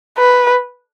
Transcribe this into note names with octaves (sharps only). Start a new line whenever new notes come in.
B4